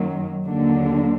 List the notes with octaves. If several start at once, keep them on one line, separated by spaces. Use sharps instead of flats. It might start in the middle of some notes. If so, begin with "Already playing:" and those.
Already playing: F#2 D#3 F#3 A#3
D#2 D3 F#3 A#3 D4